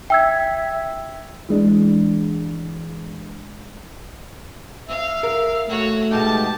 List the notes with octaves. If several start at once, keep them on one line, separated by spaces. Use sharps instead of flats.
E5 G5 E6 G#6
E3 G#3 D4
E5 F5
A#4
A3 F#4 C#5
B2 G#3 D#4 G4 A5